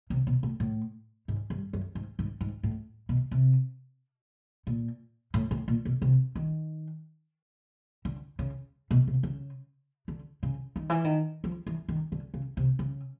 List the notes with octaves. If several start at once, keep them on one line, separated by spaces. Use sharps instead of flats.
C3
B2
A2
A2
G#2
G2
F#2
G#2
G#2
G#2
A2
B2
C3
A#2
A2
A2
A#2
B2
C3
D#3
D3
C#3
B2
C3
C#3
D3
C#3
D#3
E3
D#3
F3
E3
D#3
D3
C#3
C3
C#3